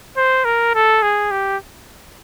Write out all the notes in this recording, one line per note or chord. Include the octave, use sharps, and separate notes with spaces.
C5
A#4
A4
G#4
G4